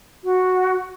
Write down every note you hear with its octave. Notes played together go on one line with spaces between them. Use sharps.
F#4